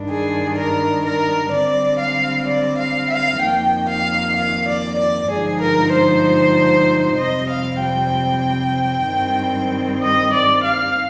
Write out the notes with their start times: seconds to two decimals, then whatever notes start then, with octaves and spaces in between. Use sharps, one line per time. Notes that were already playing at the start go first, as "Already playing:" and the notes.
Already playing: G2 D#3 G3 D4
0.10 G#4
0.57 A#4
1.05 A#4
1.52 D3 G3 C4 D5
1.99 F5
2.46 D5
2.77 F5
3.10 F5
3.41 F2 D#3 A#3 G5
3.88 F5
4.36 F5
4.67 D5
4.99 D5
5.30 G2 D3 F3 G#3 D#4 G#4
5.61 A#4
5.93 C5
7.18 F2 C3 G3 C4 D#5
7.50 F5
7.81 G5
9.08 G2 D#3 G3 C4
10.03 D#5
10.34 D5
10.65 F5